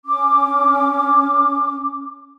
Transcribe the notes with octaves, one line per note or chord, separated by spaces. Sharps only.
C#4 D6